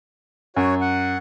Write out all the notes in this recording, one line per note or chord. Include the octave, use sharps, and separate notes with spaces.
F#2 F#4 C#5
F#5